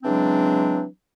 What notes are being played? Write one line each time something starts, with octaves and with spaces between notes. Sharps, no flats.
C#3 E3 F#3 G#3 C4 D4